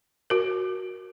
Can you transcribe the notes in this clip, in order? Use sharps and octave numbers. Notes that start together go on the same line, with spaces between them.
F#4 A#4